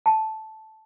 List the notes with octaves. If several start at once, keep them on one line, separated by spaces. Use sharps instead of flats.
A5